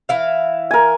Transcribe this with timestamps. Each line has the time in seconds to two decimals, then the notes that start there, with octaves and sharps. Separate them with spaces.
0.09 E3 E4 F5
0.71 A#4 G#5